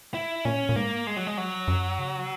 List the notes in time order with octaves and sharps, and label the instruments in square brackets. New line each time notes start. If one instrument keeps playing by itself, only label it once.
[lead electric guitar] E4
[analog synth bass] A#2 [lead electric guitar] C#4
[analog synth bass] A#2
[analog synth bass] G#2 [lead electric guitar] A#3
[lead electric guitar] G#3
F#3
G#3
F#3
[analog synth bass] F#2
C#3